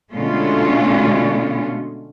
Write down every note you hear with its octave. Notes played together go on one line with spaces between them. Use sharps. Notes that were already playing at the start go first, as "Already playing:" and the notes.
B2 D3 G#3 A3 C#4 F4